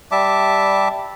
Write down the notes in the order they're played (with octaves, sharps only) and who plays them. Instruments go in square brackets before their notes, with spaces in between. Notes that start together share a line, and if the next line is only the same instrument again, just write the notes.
[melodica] G3 E5 A5 D6